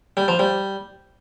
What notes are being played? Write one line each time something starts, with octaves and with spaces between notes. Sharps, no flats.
G3
F3
G3